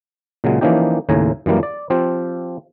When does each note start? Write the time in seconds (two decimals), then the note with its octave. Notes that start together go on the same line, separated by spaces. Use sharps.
0.44 A#2 C#3 F#3 G#3
0.61 E3 F3 A#3 C#4 D#4 G4
1.09 D#2 A2 C#3 G#5 A#5
1.46 F#2 E3 G3 A#3
1.63 D5
1.90 F3 C4 F4 G4